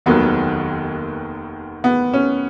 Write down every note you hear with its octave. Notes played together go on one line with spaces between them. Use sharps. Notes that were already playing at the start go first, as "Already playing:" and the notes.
F1 D#2 D#3 F#3 B3
B3
C#4